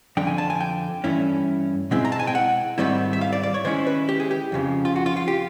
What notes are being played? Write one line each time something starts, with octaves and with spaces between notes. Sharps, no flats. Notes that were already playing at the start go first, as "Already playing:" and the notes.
F2 D3 F3 D4 G5
G#5
A5
G#5
G5
G2 E3 A3 C#4 E4
B2 G#3 C4 E4
A#5
A5
G#5
G5
F#5
G#2 D#3 G3 C4 E4
E5
F5
D5
D5
C#5
D#3 G#3 C#4 E4 C5
B4
G4
G#4
G4
F2 C#3 F3
F4
F#4
F4
F4
G4